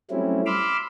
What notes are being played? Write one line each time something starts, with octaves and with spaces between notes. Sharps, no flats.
F#3 G3 A3 C4 C#4 E4
B5 C6 D6 E6 F6